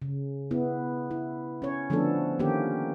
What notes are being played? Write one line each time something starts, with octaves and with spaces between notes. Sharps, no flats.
C#3
B3 E4
E4
C#4 C#5
D3 F3 A3 B3 D4 A4
D#3 A#3 C#4 G4